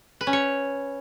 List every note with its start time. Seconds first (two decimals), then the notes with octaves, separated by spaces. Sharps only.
0.21 B4
0.27 C#4
0.33 C#5